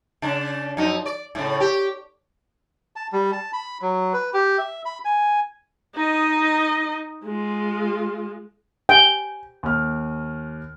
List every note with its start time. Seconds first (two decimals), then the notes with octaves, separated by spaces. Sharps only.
0.22 C#3 D4
0.77 F#2 F3 D#4
1.06 D5
1.35 A2 C#3
1.60 G4
2.96 A5
3.13 G3
3.32 A5
3.53 B5
3.82 F#3
4.13 B4
4.34 G4
4.58 E5
4.86 B5
5.05 G#5
5.95 D#4 D#5
7.24 G#3 F4
8.89 G5 G#5
9.63 D#2 F6